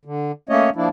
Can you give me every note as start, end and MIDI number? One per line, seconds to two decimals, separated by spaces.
0.05 0.32 50
0.49 0.70 57
0.49 0.70 58
0.49 0.70 61
0.49 0.70 73
0.49 0.70 75
0.76 0.89 53
0.76 0.89 58
0.76 0.89 62
0.76 0.89 64